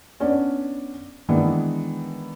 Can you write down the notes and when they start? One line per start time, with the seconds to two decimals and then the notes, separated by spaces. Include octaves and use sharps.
0.20 B3 C#4 D4 D5
1.29 D#3 E3 G#3 B3 D4